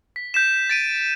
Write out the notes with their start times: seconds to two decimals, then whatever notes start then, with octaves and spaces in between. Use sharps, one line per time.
0.16 B6
0.34 G6 B6 E7
0.70 A6 D7 D#7